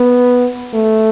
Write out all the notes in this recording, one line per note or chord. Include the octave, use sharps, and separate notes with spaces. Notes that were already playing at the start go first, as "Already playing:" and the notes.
Already playing: B3
A3